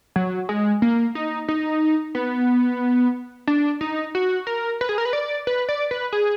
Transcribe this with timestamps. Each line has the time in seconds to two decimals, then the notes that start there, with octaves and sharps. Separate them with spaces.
0.16 F#3
0.49 G#3
0.82 A#3
1.15 D#4
1.48 D#4
2.15 B3
3.47 D4
3.81 D#4
4.15 F#4
4.47 A#4
4.81 B4
4.89 G#4
4.98 A#4
5.05 B4
5.13 D5
5.47 B4
5.69 D5
5.91 B4
6.13 G#4